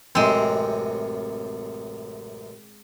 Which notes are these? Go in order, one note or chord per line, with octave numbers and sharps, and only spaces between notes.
A1 F#2 C3 G#3 C4